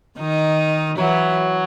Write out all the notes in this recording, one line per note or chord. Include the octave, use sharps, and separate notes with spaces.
D#3 D#4
E3 F#3 E4